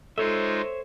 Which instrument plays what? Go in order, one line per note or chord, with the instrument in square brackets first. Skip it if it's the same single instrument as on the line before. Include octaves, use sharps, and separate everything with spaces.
[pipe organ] G#3 D#4 F4 [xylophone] A4 [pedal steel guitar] C5 C#5 E5